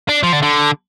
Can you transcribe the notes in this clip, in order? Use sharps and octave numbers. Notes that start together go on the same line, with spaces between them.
D4
F3
D3
D3